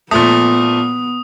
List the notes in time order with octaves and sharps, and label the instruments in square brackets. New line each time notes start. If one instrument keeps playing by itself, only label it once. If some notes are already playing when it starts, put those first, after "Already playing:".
[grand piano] A#2 F3 A3 [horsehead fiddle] B3 [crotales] D#6